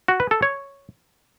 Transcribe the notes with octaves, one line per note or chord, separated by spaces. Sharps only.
F#4
B4
A4
C#5